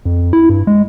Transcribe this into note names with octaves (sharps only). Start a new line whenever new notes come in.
F2
E4
G2
G#3